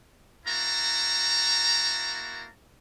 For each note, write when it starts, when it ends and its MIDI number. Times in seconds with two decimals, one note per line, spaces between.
0.46 2.48 58
0.46 2.48 64
0.46 2.48 66
0.46 2.48 81
0.46 2.48 82